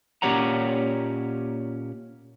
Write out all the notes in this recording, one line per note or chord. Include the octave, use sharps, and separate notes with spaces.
A#2 C#4 G4 C#5 F#5 A#5